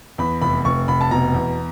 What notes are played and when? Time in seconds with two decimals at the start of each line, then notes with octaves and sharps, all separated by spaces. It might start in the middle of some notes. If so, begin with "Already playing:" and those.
0.18 E2 B5
0.42 F1 B5
0.65 F1 C#6
0.88 F1 B5
1.01 A5
1.11 B2 A#5
1.34 E2